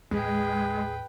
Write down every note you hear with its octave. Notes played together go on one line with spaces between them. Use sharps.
A1 D#2 G#3 G#4 B4 G5